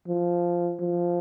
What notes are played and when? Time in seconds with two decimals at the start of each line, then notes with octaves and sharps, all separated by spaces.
0.08 F3
0.80 F3